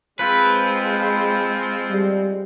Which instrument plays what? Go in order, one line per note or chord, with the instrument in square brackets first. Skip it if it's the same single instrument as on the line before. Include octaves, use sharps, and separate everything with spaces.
[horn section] F3 C4 [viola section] G#3 [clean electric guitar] B4
[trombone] G3